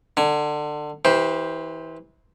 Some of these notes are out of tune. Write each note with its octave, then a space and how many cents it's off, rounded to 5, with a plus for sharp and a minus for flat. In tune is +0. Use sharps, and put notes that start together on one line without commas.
D3 +25 G#5 +0
E3 -25 G4 +0 C5 +0